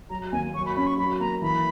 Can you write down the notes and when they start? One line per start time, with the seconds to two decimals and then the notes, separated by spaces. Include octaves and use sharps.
0.10 F#3 A#5
0.32 D#2 G#5
0.54 F#3 C#6
0.66 B5
0.76 C#4 B5
0.87 C#6
0.98 F#3 B5
1.20 A#3 A#5
1.42 E3 B5